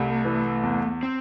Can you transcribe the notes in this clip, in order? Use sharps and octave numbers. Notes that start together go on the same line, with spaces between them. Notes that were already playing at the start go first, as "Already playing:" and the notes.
Already playing: C2 G3 A3
E3
E2
C4